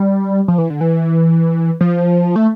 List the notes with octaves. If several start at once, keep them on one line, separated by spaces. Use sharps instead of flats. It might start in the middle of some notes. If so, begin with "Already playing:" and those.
Already playing: G3
F3
E3
D3
E3
F3
A3